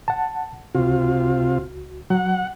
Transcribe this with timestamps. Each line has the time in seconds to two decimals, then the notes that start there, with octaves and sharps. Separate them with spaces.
0.08 F#5 A5
0.75 C#2 C3 F4 F#4
2.10 F#3 F#5